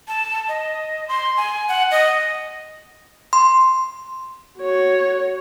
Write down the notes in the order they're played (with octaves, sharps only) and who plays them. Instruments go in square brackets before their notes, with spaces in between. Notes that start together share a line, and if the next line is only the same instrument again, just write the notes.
[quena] A5
D#5
C6
G#5
F#5
D#5
[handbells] C6
[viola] F#4 C#5